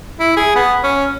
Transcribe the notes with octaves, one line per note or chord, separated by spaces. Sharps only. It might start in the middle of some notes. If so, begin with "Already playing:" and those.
E4
G#4
B3
C#4